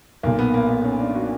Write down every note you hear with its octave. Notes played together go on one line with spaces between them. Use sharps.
B1 A#2 A#3
B3
A#3
B3
C#4
D4
F#4